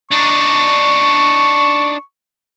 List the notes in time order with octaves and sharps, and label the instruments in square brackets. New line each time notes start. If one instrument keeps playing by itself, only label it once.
[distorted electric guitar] D4 D#4 [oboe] C#6